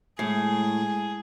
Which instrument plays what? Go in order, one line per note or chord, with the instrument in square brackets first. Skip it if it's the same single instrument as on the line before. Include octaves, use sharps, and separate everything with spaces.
[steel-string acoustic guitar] A2 [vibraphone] G#3 [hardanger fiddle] G#4